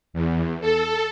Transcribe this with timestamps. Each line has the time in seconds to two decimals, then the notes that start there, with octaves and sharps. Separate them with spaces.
0.13 E2
0.61 A4